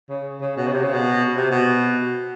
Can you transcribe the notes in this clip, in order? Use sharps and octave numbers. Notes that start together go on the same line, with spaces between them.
C#3
C#3
B2
C#3
C3
C#3
B2
C3
B2